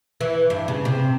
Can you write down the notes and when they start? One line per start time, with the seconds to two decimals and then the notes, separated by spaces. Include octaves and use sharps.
0.21 E3
0.50 G2
0.68 C#3
0.85 C3